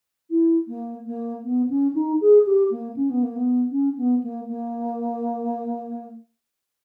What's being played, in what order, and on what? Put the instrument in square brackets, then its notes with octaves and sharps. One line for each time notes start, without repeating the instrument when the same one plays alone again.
[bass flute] E4
A#3
A#3
B3
C#4
D#4
G#4
G4
A#3
C#4
B3
A#3
B3
C#4
B3
A#3
A#3